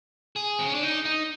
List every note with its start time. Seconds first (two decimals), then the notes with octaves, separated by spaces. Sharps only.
0.36 G#4
0.59 C4
0.66 C#4
0.75 D4
0.83 D#4
1.05 D#4